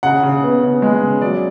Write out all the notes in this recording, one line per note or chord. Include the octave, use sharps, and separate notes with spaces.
C#3 F#5
C#3
B3
C#3
G#3
C#3
F#3 D5